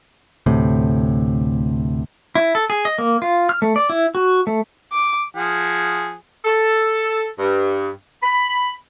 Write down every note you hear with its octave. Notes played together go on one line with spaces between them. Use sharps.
D2 A2 C3
E4
A4
G#4
D#5
A#3
F4
F6
A3
D5
E4
F#4
A3
D6
F3 G#4 F#5
A4
G2
B5